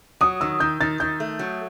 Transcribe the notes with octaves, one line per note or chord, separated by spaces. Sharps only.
F#3 D#6
D#3 E6
D#3 G6
D#3 A6
D#3 G6
A3
F#3